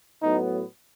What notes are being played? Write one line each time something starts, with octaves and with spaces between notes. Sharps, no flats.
A2 F#3 B3 D#4